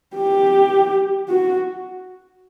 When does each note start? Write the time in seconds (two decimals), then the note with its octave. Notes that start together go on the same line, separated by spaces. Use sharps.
0.15 G4
1.29 F#4